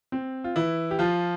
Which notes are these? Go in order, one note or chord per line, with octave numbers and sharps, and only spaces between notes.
C4
F4
E3 E4
G4
F3 F4